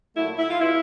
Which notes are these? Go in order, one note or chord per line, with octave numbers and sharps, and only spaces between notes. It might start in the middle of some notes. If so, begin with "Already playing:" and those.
A#2 F#3 A3 E4
E4
F4
B2 G#3 E4